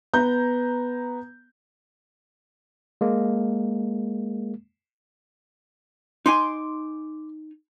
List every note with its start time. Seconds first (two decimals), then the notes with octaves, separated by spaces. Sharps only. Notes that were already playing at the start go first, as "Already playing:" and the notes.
0.13 B3 A#5 G6
3.01 G#3 A#3
6.26 D#4 G#5 C6 D6